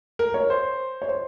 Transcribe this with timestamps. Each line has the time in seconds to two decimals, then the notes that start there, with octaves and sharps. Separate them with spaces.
0.19 A#4
0.34 C#5
0.50 C5
1.02 C#5
1.09 C5